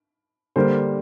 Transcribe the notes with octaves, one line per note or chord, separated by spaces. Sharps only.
D3 G3 A#3 C5